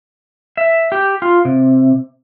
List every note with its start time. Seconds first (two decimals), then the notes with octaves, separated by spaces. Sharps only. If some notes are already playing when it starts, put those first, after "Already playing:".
0.57 E5
0.92 G4
1.22 F4
1.45 C3